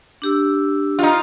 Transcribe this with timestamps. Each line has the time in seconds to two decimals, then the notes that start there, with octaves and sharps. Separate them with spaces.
0.22 D4 G4 E6
0.99 D#4 F4